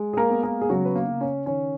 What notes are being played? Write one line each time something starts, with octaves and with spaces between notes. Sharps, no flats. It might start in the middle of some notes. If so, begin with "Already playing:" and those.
Already playing: G#3
G#4
A#3 A#4
B3
A#3 A#4
G#4
C#3 F#3 F#4
B4
A#3 A#4
C#3
C#4 C#5
D#3 C#4 C#5